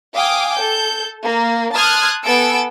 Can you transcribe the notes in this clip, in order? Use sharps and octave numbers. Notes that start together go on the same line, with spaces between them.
F5 G5 G#5 D6 D#6
A4 G6
A#3
A5 C6 D#6 F6 F#6 G#6
B3 A4 G#5 E6 D7